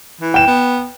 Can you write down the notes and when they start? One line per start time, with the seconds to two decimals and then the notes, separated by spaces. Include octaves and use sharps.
0.21 E3
0.34 G5 E7
0.47 B3